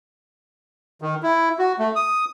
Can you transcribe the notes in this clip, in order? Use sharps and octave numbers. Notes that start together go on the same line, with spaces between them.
D#3
E4
F#4
A3
D#6